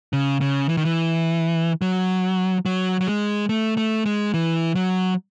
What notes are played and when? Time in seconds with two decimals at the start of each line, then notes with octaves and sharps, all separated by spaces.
0.13 C#3
0.41 C#3
0.69 E3
0.77 D#3
0.85 E3
1.82 F#3
2.65 F#3
3.01 F#3
3.07 G#3
3.49 A3
3.77 A3
4.06 G#3
4.34 E3
4.75 F#3